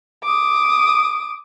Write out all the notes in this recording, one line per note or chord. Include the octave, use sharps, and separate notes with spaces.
D6 D#6